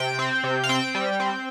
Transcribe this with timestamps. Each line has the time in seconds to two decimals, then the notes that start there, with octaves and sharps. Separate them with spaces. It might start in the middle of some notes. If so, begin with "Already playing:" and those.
Already playing: C3 G5
0.19 C4
0.44 C3
0.64 F5
0.69 C4 G5
0.95 G3
1.20 C4